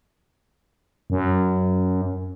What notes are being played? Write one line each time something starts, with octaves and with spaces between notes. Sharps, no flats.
F#2